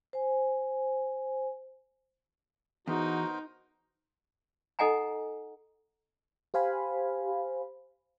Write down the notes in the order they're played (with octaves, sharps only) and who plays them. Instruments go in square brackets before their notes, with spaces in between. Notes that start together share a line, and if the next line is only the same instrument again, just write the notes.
[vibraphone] C5 G#5
[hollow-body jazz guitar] E2 [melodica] B3 A#4 C5 [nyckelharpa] D#4 [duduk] F#4
[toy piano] D#4 A4 D#5 F#5 G#5 A#5
[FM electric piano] G4 C5 F5 G#5 B5